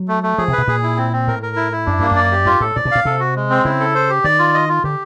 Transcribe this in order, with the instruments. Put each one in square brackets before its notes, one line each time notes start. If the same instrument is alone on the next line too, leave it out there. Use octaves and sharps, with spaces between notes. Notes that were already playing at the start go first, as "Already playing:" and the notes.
Already playing: [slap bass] F#3
[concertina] A3
A3
[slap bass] F3 [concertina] G#4
[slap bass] C3 [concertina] B4
[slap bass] B2
[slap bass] A#2 [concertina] G#4
[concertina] E4
C4
C4
[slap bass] A2 [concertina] A#4
[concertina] A#4
E4
E4
[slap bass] F#2 [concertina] D4
[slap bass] G2 [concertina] A#3
[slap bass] F#2 [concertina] D5
[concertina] G4
[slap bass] G2 [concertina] F4
[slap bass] A2 [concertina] A4
[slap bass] A#2 [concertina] D5
[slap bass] B2
[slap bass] A#2 [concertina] F5
[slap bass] C3 [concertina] A4
[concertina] F#4
G#3
C4
[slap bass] C#3 [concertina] E4
[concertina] A4
C5
G4
[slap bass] D#3 [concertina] D5
[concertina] F4
D#5
F4
[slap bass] D3 [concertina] G4